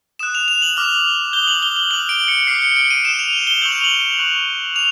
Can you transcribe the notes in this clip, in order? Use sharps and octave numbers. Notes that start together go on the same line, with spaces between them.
D#6 F#6 E7
F7
F7
F#7
D6 F6
G6 G7
D#6
F#7
G7
G7
D6 F#6 F#7
D7
C#7
D6 F6 C7
C#7
D7
D#7
D#6 G6 E7
F7
G7
G7
C#6 E6 G6 F#7
F7
F#7
C#6 F#6
D6 F7